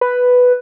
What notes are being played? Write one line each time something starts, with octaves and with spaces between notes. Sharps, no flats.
B4